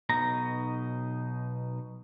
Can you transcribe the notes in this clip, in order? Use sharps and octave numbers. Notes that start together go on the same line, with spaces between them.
B1 B2 D#4 A#5